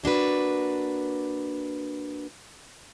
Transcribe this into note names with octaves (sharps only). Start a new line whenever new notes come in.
A#3 D4 F#4 B4